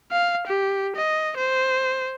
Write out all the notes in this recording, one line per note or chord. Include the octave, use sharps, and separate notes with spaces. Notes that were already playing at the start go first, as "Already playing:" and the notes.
F5
G4
D#5
C5